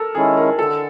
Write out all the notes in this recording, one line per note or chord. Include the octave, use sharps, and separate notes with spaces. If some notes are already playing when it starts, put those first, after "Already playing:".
Already playing: A4 A#4
D#3 G#3 C#4 E4 G#4
A#4
D3 A4